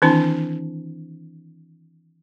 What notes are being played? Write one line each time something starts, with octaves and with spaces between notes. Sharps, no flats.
D#3 E3 C4 D4 E4